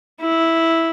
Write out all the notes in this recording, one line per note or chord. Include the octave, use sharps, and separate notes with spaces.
E4